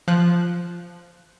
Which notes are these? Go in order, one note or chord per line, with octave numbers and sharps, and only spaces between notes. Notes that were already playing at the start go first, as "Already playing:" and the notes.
F3 F#6